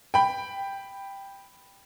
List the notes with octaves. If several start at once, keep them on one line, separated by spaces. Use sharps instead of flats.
G5 B5